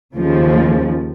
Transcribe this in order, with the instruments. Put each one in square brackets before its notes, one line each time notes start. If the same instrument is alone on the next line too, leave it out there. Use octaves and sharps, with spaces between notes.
[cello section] D#2 C#3 F3